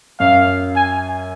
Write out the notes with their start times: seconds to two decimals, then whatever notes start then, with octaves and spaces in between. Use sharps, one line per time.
0.20 F#2 F5
0.76 G#5